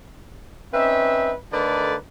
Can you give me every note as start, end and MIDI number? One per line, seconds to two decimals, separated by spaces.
0.73 1.32 60
0.73 1.32 61
0.73 1.32 63
0.73 1.32 71
0.73 1.32 76
1.53 1.95 50
1.53 1.95 57
1.53 1.95 63
1.53 1.95 70
1.53 1.95 71
1.53 1.95 74